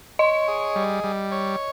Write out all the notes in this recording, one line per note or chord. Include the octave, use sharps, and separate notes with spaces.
C#5 D#5
G#4
G3
G3
C#5